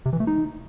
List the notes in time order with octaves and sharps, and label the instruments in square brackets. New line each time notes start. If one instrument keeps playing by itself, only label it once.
[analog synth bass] C3
E3
A3
D#4